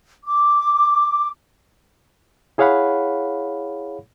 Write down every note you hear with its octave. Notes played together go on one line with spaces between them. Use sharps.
D6
E4 G#4 C#5 F5 F#5 B5